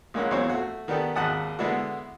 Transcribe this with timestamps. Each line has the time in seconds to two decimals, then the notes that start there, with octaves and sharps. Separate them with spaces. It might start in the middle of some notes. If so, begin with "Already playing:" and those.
0.14 A#1 G#3 A#3 C#4 F#5
0.31 A#1 E2 F#3 C4 C5 C#5
0.49 A3 F#4
0.88 D#3 B3 D4 G4 A4
1.16 G#1 D#2 F#5 A5 D#6
1.59 D3 G#3 B3 D4 E4 F#4